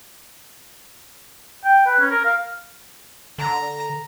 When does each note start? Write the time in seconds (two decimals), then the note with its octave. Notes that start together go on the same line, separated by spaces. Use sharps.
1.65 G5
1.86 B4
1.99 C#4
2.11 A#4
2.25 F5
3.38 D3 A#5